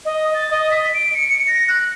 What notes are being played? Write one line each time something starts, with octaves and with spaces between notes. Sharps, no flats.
D#5
A6
D#5
B6
D7
C#7
A#6
F#6